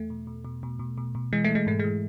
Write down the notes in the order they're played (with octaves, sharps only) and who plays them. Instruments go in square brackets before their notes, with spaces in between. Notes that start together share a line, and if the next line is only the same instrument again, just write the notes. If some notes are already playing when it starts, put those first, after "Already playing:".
Already playing: [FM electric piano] E2 A3
B2
B2
B2
B2
B2
B2
B2
E3 G#3
A3
E3
G#3
G#2 A3
E3 G#3